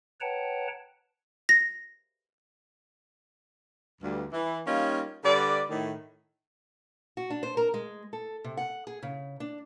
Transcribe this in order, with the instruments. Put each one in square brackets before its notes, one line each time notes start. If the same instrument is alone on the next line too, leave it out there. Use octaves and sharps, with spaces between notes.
[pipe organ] B4 C#5 F#5 G5 A5 A#5
[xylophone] A#6
[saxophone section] D2 G2
E3
G3 A#3 C#4 D#4 F4
D3 G3 B4 D5
A2 D#3
[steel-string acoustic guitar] F#4
D4
C5
A#4
G#3
A4
C3
F#5
G#4
C#3
D4